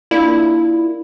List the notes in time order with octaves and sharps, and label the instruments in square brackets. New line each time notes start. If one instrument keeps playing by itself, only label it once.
[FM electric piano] A#3 D4 F4 [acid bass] E4